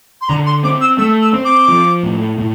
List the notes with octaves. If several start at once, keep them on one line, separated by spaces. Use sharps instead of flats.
C6
D3 A#5
C6
C4 D6
E6
A3 E6
E6
C4
D6
F3
A2
A2